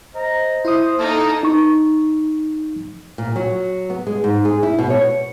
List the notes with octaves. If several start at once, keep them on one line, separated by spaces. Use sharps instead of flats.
C5 D#5 A#5
E4 C5 D#6
A#3 D#4 A4
D#4 C#6
A#2
F#3
B3
G#3
G#2
G#4
E4
B2
C#5